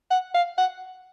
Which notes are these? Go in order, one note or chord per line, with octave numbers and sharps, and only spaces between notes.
F#5
F5
F#5